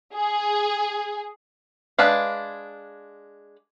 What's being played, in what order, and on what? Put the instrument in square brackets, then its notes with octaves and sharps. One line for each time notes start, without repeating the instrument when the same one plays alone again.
[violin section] G#4
[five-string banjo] G#3 D4 B4 F5